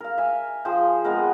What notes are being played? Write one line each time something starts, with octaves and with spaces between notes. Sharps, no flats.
A#4 F5
E5 G#5
F3 G#4 C5 G5
G#3 B3 C4 A#4